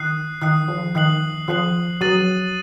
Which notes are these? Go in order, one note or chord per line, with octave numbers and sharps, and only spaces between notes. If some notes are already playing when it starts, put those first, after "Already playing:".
Already playing: D#3 D#6 F#6 C7
D#3 D#6 F#6 C7
F3
D#3 D#6 F#6 C7 F#7
F3 D#6 F#6 C7 F#7
F#3 D#6 A6 D#7 F#7